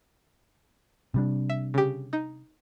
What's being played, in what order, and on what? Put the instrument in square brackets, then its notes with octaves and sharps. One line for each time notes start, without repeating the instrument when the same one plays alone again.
[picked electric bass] C3 G3 D4
[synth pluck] E5
C#3 G4
D#4